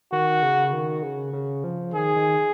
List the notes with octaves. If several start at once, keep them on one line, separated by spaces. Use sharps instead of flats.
D#3 F#4
C#3
D#3
C#3
C#3
F3
D#3 G#4
D#3